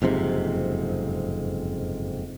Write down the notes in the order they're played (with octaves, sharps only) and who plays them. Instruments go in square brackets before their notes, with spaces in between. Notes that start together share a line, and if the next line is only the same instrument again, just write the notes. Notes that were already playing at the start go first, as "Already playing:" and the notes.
[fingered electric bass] F#1 F2 G#2 C3